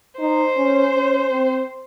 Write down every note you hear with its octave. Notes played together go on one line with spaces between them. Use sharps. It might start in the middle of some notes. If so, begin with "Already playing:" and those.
D#4 C5
C#4
C#4
C4